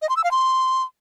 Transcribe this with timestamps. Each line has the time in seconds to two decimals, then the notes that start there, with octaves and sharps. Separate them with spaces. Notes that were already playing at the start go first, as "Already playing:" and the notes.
0.02 D#5
0.09 C6
0.17 E6
0.24 F5
0.31 C6